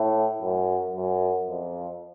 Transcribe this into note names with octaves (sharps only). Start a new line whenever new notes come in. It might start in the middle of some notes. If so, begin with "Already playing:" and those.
Already playing: A2
F#2
F#2
F2